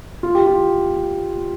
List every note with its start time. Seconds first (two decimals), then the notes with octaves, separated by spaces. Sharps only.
0.23 F4
0.35 G4
0.46 F4